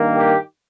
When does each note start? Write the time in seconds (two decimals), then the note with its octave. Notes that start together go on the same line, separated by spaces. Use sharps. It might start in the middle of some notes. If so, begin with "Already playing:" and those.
Already playing: G2 D#3 A#3
0.16 G4